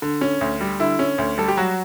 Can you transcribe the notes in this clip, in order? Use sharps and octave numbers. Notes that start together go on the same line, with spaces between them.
D3
C#4
D2
G3
D3 E4
C#4
D2
G3 A4
G4
F#3 F#4